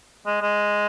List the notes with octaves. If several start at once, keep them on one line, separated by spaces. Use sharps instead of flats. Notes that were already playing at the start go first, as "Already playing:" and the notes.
G#3
G#3